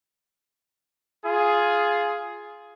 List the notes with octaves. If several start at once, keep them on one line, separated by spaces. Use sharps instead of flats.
F4 G#4